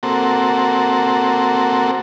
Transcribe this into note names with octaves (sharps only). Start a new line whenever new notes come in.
A#3 C4 F#4 A4